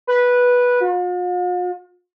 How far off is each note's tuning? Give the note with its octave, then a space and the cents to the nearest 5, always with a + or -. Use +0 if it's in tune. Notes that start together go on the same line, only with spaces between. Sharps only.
B4 -10
F4 +45